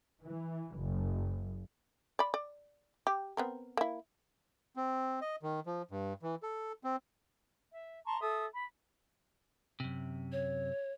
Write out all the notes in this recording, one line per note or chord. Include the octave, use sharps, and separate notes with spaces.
E3
F#1
D5 B5
D5
G4
B3 C4 A#4
A#3 E4
C4
D#5
D#3
F3
G2
E3
A4
C4
E5
A5 A#5 C6 C#6
A4 E5 D#6
B5
F#2 C3
C#5